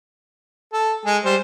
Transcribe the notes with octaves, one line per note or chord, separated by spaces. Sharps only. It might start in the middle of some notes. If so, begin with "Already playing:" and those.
A4
G#3 G#4
G3 C5